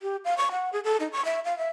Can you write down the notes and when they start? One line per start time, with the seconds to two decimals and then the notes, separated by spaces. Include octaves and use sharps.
0.02 G4
0.25 F5
0.37 C#6
0.51 F#5
0.73 G#4
0.84 A4
1.00 D#4
1.12 C#6
1.25 E5
1.45 F5
1.58 E5